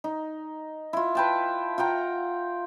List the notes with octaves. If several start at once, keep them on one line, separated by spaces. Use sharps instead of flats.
D#4
E4 F4
B4 G5 A5
F4 F#5 G5 A#5